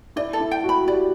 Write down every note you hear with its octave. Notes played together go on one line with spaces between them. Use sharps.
E4 D5
A4
E4
G5
F#4
B5
G4 D5